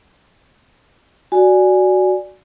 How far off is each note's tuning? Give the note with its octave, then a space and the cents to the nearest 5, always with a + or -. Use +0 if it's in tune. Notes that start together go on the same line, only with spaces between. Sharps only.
F#4 +5 D5 +0 G#5 +0